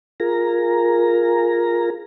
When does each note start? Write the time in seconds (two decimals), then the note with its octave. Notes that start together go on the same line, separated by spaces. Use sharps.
0.20 F4 G#4 A#4 A#5